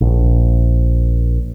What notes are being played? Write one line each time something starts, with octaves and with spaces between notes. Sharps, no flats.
A#1